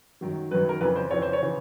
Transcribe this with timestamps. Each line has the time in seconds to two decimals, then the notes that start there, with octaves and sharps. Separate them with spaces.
0.21 F#2 D#3 F#3
0.51 F#2 D#3 F#3 B4
0.69 A#4
0.80 F2 C#3 E3 B4
0.96 C5
1.10 F2 C#3 E3 C#5
1.22 C5
1.33 C#5
1.42 C#3 E3